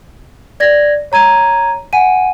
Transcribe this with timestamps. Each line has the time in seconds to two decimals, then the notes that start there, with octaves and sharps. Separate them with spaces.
0.60 D5 G#6 A#6
1.12 C#5 A#5 G#6 D#7
1.93 F#5 G#5 D#7